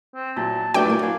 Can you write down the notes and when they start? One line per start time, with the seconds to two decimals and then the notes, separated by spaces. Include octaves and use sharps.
0.15 C4
0.37 A#2 F#3 E4 A5
0.74 F#3 A3 B3 D4 G5 D6
0.86 F#3 A#3 E4 D6
1.03 F5 G#5